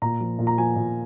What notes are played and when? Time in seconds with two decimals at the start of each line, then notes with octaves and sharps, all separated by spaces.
0.02 A#2 A#5
0.20 F3
0.39 A#2
0.47 A#5
0.58 F3 G#5
0.76 A#2